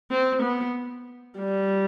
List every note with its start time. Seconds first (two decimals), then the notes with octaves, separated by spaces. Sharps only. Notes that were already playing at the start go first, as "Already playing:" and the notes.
0.10 C4
0.43 B3
1.39 G3